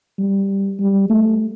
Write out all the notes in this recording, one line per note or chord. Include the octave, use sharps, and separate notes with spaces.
G3
G3
A3